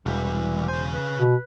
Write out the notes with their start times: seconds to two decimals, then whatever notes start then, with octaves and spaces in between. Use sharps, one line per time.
0.06 E1 C2 E3 G3
0.68 C#3 C5 G#5
0.93 B4
1.18 B2